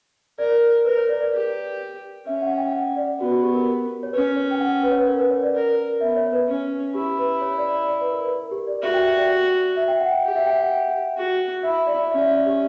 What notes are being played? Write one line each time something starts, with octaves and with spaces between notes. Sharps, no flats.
A#4 D5
A#4 B4
C#5
D5
D5
G4
C#4 E5
F#5
G5
F#5
D5
B3 F#4
F#4
G4
A#4
C#5
C#4 B4
C#5
G5
F#5
B4
C#5
B4
A#4
B4
C#5
D5
A#4
B3 E5
C#5
B4
C#4
E4 G4
B4
C#5
C#5
D5
D5
D5
B4
A#4
B4
A#4
G4
D5
F#4 E5
G5
E5
D5
E5
G5
F#5
G5
G4
E5
G5
F#5
F#4
E4 E5
D5
C#4 E5
D5
E5
D5
G4